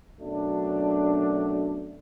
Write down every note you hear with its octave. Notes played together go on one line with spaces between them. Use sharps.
F#2 B2 F#3 A3 D4